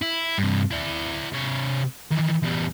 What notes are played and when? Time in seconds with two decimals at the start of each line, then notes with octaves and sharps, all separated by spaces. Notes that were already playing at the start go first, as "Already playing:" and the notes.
0.02 E4
0.38 G2 C3
0.71 E4 D5
1.33 C3 C#5
2.11 D#3 E3
2.42 E2 G3